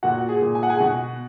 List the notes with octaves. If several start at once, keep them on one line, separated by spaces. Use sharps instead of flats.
A#2 F#4 F#5
G#4 G#5
A#2
G#5
F#5
G#4 G#5
B2 F#4 F#5